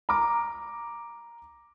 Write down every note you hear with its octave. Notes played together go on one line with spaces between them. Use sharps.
A#5 D6